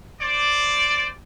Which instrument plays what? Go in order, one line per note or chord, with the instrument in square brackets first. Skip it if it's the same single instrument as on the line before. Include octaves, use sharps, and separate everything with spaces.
[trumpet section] C5 D5